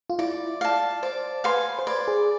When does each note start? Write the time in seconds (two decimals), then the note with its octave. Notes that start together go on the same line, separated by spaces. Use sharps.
0.10 F4
0.19 E4 D5
0.61 D5 F5 A5
1.03 C5 D5
1.44 B4 F5 G#5 C6
1.79 C5
1.87 B4 D5
2.08 G#4